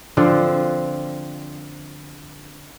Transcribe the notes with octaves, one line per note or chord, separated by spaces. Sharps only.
D3 F3 C4